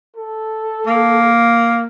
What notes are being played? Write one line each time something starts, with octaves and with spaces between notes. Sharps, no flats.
A4
A#3